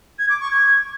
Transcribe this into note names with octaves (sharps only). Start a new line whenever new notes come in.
G#6
D6
C#6
G#6